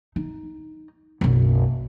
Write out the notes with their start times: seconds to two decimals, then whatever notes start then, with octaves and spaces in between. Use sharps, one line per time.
0.16 D#4
1.21 F#1 B1